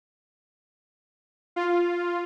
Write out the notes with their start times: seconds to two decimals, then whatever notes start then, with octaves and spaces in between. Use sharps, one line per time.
1.56 F4